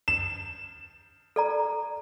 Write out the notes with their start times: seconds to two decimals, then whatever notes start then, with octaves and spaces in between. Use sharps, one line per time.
0.08 E7
1.36 A4 D5 A#5